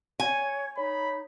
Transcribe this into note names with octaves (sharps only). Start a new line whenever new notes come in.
C#5 G#5
D#4 C#5 B5